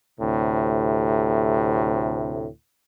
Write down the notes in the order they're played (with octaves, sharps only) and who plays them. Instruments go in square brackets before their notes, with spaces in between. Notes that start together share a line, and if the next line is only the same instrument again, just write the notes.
[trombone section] D2 A2 C3